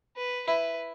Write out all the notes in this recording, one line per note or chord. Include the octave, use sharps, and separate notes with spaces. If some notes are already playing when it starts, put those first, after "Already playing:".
B4
E4 B4